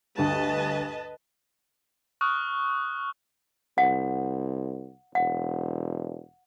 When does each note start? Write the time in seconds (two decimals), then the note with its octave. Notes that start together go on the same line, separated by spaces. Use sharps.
0.18 D2 G2 B4 D#5 A5
2.21 C#6 D#6 F6 F#6
3.78 C2 F#5
5.15 E1 F#5